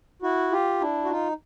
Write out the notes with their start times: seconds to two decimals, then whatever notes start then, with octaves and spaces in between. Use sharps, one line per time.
0.22 E4 F#4
0.52 F4 G4
0.81 D4 E4
1.04 F#4
1.10 D#4 F4